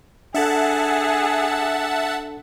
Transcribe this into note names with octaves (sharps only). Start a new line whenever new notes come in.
D4 G#4 A4 E5 F#5 A5